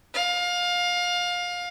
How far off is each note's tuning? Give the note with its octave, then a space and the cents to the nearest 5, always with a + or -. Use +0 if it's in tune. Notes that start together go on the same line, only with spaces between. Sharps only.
F5 +25